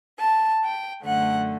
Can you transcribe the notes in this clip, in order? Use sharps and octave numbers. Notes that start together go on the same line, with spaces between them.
A5
G5
F#2 D3 A3 F#5